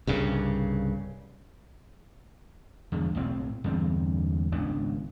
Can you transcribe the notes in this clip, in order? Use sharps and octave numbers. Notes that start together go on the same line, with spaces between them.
C2 G2 C#3
E2 G2 D3
B1 A2 C4
E2 G2 D3 C4
G#1 C#2 B3 D4